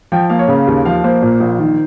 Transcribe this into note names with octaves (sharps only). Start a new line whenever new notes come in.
F3 G5
A#3 F5
C#5
C#3 F5
D#2
F3 F5
A#3 C5
A#2
A#1
D#3